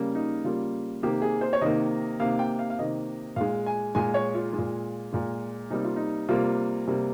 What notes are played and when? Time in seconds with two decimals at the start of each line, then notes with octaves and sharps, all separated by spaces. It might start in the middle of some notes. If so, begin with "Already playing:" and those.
Already playing: C#3 G3 A#3
0.15 D#4
0.44 C#3 G3 A#3 F4
1.02 C3 D#3 A#3 G4
1.22 G#4
1.41 C5
1.53 C#5
1.61 C3 D#3 A#3 D#5
2.20 C3 D#3 A#3 F5
2.39 G5
2.59 F5
2.70 F5
2.78 C3 D#3 A#3 D#5
3.36 A#2 G#3 F5
3.66 G#5
3.95 A#2 G#3 G#5
4.14 C#5
4.34 F4
4.53 G#3
4.58 A#2
5.13 A#2 G#3
5.70 C3 G3 A#3 D#4
5.84 F4
5.96 D#4
6.28 C3 G3 A#3 F4
6.87 C3 G3 A#3